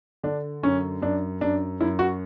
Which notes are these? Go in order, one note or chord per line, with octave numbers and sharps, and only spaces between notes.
D3 D4
F#2 C#4
F#2 D4
F#2 D4
F#2 E4
F#4